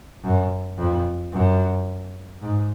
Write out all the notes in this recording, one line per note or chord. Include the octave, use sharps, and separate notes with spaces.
F#2
F2
F#2
G#2